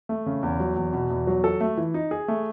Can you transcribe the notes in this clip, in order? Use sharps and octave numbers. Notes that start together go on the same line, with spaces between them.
A3
C#3
E2
F#3
E2
B2
E2
F#3
A4
A3
E3
D#4
G#4
A3